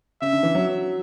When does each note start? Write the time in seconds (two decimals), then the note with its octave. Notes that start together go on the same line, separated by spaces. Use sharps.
0.22 C#3 E5
0.33 D3
0.43 E3
0.55 F#3